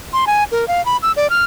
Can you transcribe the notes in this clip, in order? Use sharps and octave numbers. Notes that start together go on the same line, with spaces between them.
C6
G#5
A#4
F5
B5
E6
D5
F6